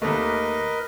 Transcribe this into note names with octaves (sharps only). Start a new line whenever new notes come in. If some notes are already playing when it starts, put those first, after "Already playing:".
D#2 A3 A#4 B4 D#5